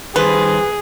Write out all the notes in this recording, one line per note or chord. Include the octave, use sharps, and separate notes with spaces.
D#3 G3 G#4 B4 C5